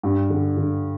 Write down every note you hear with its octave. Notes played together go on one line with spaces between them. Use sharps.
G2
D3
D3